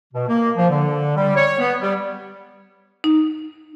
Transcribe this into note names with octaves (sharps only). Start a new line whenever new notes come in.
B2
A#3
F3
D3
G3
C#5
B3
G3
D#4